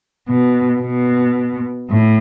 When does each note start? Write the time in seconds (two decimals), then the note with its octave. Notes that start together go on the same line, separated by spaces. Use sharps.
0.28 B2
0.82 B2
1.90 A2